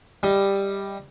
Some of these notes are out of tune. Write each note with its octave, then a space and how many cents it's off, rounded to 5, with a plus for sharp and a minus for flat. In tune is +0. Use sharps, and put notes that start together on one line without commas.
G3 +10 D#5 +25